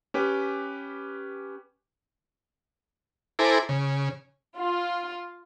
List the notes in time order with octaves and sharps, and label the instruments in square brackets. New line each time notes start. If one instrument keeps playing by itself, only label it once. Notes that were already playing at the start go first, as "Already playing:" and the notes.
[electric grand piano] C#4 G4 B4
[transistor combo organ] E4 A4 C5 G#5 A#5 D6
C#3
[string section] F4